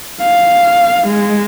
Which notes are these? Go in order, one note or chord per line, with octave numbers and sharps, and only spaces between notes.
F5
G#3